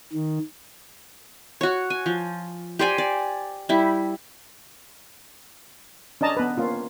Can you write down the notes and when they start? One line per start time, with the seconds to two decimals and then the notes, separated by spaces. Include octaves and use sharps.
0.13 D#3
1.61 F#4 C#5
1.90 G#5
2.06 F3
2.79 G4 C5 D5 G#5
2.98 D5
3.69 G3 E4
6.21 C#4 D4 D#5 A5 A#5
6.37 B3 B4
6.58 A#3 C#4 F4